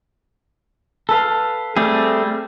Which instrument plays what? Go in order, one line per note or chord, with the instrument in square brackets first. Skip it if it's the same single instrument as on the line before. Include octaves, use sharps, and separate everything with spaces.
[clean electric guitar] A4 B4 F5
[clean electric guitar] G3 [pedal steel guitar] A3 C4 G#4